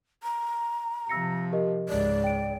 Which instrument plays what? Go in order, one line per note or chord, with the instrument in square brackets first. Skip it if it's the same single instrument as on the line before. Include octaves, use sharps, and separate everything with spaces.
[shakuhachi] A#5
[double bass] C3 F3 [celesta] E6 A#6 C#7
[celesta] G4 A#4 D#5
[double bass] C#2 G#2 [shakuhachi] D5
[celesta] G5 D7